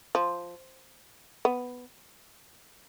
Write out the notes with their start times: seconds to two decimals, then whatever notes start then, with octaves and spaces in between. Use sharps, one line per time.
0.15 F3
1.45 B3